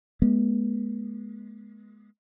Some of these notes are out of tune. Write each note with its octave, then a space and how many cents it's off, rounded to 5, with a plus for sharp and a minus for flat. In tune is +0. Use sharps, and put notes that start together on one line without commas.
G#3 +15 B3 -40